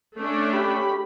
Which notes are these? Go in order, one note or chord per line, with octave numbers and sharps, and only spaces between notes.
A3 C#4 D4
G4 B5